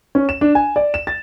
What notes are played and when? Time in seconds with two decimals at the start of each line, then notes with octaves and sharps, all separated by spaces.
0.15 C#4
0.29 E7
0.41 D4
0.55 G#5
0.76 D5
0.94 E7
1.07 A6